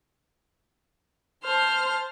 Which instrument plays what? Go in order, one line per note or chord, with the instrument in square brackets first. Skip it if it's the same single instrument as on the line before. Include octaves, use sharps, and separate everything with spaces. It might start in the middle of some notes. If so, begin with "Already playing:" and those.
[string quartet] C5 A5 F6